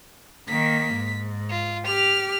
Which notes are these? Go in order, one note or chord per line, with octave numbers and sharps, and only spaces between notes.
D#3 A#3 B6
G#2
F4
G4 F6 F7